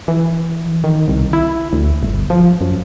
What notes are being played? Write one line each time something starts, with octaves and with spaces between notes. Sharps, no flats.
E3
D#3
C2
E4
D2
G1
F3
F#2